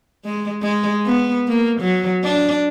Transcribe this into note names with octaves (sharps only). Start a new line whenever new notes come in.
G#3
G#3
B3
A#3
F#3
D4